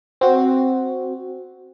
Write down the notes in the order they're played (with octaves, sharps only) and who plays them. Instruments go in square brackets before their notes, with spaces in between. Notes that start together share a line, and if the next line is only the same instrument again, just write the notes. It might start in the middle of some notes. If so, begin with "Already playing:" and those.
[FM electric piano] C4 F#4